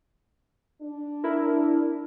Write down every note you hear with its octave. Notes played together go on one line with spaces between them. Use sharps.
D4
E4 A#4